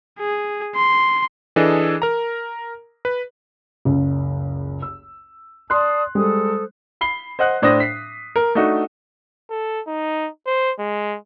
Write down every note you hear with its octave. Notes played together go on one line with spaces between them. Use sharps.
G#4
C6
E3 D4 G#4 A4 D#5
A#4 A#5
B4
F#1 C#2
E6
D5 A5 C6 D#6 F#6
G3 G#3 A4 C5 D#6
B5 C7 G7
C5 D#5 F#5 F#6
A2 D4 C5 D#6 A#6
B6 C7
A#4
A3 D4 D#4 F#4
A4
D#4
C5
G#3